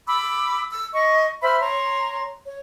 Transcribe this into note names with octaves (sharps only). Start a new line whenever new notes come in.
B5 D6 E6
E6
D#5 C#6
C5 E5 B5 F6
C#5 A#5 C6
C#5